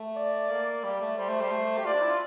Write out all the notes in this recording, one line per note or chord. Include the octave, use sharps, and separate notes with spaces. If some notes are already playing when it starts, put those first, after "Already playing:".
Already playing: A3
D5
A#3
G3 D5
A3
G3 C5
A3
G3
A3
G4
F4 D5
D4
E4
F4